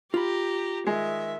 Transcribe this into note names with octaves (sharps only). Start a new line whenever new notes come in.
F4 G4 A#5 B5
D#3 G#3 E5